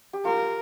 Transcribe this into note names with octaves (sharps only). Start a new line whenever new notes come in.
G4
F4 A#4